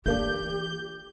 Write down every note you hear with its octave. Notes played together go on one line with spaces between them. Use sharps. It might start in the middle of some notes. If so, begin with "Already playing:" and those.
E3 A3 A#3 D4 F4 G4 G6